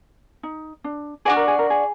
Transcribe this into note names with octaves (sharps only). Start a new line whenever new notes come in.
D#4
D4
D4 F#4 G#4 D5
A#4
G#4
A#4
G#4